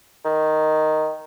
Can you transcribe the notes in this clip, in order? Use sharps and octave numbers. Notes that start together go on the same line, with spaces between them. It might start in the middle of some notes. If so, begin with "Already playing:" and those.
D#3